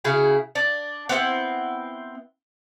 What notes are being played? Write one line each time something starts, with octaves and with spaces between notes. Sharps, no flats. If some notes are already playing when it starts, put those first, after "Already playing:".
C#3 E4 F#4 G#4
D4 D5
B3 C4 E4 F#5